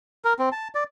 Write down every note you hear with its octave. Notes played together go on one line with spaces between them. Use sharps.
A#4
C4
A5
D5